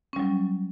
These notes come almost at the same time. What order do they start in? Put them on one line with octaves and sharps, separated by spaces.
C#4 G3 F#3